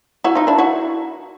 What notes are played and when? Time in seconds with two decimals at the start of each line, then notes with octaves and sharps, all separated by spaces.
0.24 E4 F#4
0.35 D#4 F4
0.47 D4 E4
0.58 E4 F#4